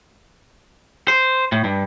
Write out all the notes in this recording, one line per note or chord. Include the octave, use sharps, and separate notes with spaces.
C5
A2
G2